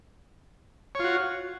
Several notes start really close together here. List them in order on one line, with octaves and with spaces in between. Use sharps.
C#5 F4 F#4